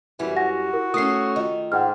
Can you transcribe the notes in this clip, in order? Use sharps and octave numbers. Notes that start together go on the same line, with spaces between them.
F#2 E3 G3 E4
F#4 F#5 G#5 A#6
A#4
A3 C#4 D#6 C7
D#3 F4 D#5
G#2 F#5 G5 F6